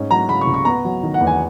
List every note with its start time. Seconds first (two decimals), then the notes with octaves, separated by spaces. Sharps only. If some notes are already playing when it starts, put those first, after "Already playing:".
Already playing: G#2 C#4
0.11 F#3 A#5
0.29 C#3 B5
0.41 C#6
0.47 C#2
0.54 C#6
0.65 B3 A#5
0.85 F#3
1.03 D#3
1.14 F#5
1.21 E2
1.27 G#5